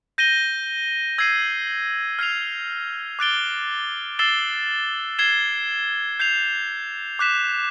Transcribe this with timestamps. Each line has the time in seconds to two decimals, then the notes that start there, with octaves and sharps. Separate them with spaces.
0.18 G6 A#6 D#7 G7
1.18 E6 G#6 C7 D#7
2.19 F6 G#6 C7 F7
3.19 D6 F#6 A6 D7 G7
4.19 E6 A6 C7 E7 G7
5.19 G#6 C7 E7 G7
6.20 G6 C7 F7
7.19 D6 F#6 B6 E7